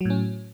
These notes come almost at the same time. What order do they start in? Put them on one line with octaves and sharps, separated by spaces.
F#3 A2 C#4